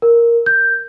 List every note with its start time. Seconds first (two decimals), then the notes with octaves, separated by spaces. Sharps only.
0.02 A#4
0.46 G6